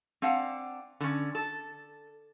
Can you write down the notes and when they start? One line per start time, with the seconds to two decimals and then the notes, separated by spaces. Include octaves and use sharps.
0.22 C4 D4 F5 F#5
1.01 D3 C#4
1.35 A4